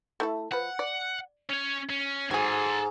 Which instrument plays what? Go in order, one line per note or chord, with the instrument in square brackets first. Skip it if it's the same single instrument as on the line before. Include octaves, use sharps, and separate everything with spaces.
[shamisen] A3 E4 A4
[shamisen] F3 B4 [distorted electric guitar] F#5
[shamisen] D5
[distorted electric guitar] C#4 C#5
C#4
[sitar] G#2 [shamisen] F#3 G#4 [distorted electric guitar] A4 G#5